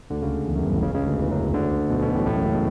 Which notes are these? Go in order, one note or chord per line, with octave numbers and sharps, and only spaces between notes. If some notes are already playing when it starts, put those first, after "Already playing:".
D2 D3
C#2 C#3
E2
F#2
G1 G2
A1 A2
C#2 C#3
C#2 C#3
D2 D3
E2 E3
F#2 F#3
D2 D3
B1 B2
B1 B2
A1 A2
A1 A2
F#2
C#2 C#3
B2